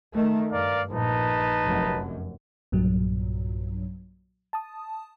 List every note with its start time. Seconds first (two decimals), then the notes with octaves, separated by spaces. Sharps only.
0.12 D#3 A3
0.51 G2 A#4 D5 F5
0.91 A#1 D#4 B4 A5
1.64 F1 F#2
2.72 B1 G2 A#2 F#3
4.53 A5 D#6